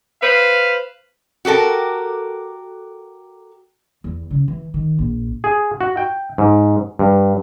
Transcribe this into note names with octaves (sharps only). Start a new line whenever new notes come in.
B4 C5 F5
F#4 G4 A4 A#4
E2
C#3
E3
D#3
A#1
G#4
F#4
G5
G#2
G2